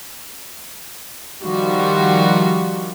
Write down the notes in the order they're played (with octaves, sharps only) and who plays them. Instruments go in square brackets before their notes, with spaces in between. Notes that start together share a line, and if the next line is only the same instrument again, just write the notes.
[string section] D#3 F3 G3 F4 F#4